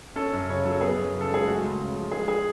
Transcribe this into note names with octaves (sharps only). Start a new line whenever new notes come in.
C#4 A4
F#2
C#3 C#5
F#3 A4
B3 G#4
F#2
C#3
A4
G#3 G#4
A3 F#4
C#2
C#3
F3
G#3 G#4
G#4